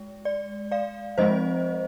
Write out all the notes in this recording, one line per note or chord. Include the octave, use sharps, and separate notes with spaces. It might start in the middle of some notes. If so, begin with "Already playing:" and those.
Already playing: G#3
D5
D5 F5
F3 G#3 C4 C5 D#5